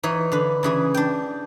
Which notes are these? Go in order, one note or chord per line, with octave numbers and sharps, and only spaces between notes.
E3 D#4 C#5
D3 B4
C#3 E3 G#4
D4 G5